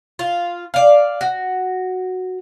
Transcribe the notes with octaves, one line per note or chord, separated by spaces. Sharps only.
F4
D5 F5
F#4